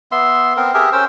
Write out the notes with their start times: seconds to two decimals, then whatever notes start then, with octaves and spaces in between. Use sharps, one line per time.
0.12 B3 E5 C6
0.57 B3 C4 A#4
0.74 G4 G#4 A#4 E5
0.93 C#4 A#4 C5 E6